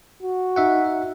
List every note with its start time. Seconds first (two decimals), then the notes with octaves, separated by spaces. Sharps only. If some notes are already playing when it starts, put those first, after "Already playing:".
0.23 F#4
0.56 D#4 E5 F#5